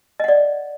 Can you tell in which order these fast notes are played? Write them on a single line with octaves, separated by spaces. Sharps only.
D#5 F#5 D5